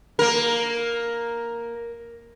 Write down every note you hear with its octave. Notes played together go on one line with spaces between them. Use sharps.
A#3 A#4